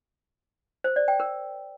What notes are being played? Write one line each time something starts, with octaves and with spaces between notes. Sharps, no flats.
C5
D5
G5
A#4